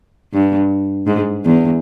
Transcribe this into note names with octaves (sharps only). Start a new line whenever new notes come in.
G2
G#2
E2